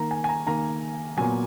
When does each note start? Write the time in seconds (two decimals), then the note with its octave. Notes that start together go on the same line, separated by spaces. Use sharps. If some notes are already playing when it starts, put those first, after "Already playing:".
Already playing: D#3 A#3 A#5
0.11 G#5
0.24 G#5
0.29 A#5
0.46 D#3 A#3 A#5
1.17 A#2 F#3 B3 G#5